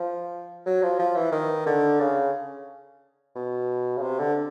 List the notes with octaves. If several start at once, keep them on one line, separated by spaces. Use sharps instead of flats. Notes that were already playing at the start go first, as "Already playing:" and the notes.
Already playing: F3
F#3
F3
F3
E3
D#3
D3
C#3
B2
C#3
C3
D3